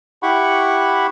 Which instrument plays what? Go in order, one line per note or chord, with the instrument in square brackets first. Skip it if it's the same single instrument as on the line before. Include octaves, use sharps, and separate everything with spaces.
[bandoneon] E4 G4 F#5 B5 C#6